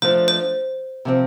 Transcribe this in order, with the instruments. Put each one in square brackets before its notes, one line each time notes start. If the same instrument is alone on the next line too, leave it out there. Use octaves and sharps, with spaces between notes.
[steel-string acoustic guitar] F3 A3 D4 [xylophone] C5
[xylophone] C5
[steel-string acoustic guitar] C3 F3 C4